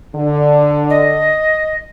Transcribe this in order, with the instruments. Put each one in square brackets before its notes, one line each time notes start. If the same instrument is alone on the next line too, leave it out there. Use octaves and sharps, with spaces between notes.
[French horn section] D3
[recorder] D#5